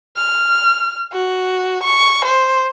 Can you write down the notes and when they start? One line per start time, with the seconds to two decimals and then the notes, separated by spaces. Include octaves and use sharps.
0.17 F6
1.12 F#4
1.83 C#6
2.25 C5